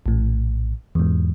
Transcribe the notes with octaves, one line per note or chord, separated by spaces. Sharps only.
A#1 A2
E2 G#2